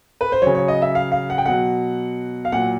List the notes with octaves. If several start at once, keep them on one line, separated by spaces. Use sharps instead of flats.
B4
C5
C#3 F#3 C#5
C#5
D#5
E5
F5
F5
F#5
G5
B2 F#3 F#5
F5
A#2 F#3 F#5